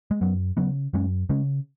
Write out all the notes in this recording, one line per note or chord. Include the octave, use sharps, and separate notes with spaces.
G#3
F#2 F#3 B3
C#3 F#3 B3
F#2 G#3 C#4
C#3 G#3 C#4